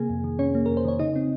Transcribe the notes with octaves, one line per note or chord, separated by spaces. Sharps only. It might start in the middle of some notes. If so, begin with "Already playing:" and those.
Already playing: C3 A#3 G#4 G#5
F2
D#3
C3 C#4 C#5
A#3
F2 A#4
C5
D#3 C#5
C#3 D#4 D#5
C4